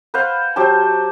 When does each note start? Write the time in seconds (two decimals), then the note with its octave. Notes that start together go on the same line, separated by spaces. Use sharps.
0.14 B4 C5 F5 F#5
0.56 F#3 G4 C5 A5